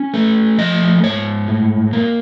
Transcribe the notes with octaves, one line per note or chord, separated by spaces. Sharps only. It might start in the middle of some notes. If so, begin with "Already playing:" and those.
Already playing: C#4
A3
F3 D#5
G#2 C#5
A2
A#3